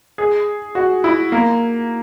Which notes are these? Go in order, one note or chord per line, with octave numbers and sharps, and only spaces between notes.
G#4
F#4
E4
A#3